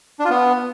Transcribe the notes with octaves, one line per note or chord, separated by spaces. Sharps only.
D4
F4
B3